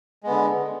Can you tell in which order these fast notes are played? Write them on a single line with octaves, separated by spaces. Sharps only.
G#3 B3 D3